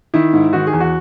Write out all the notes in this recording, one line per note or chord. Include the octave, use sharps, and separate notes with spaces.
D#3 E4
G#2
D#3 F#4
G#4
E2
F#4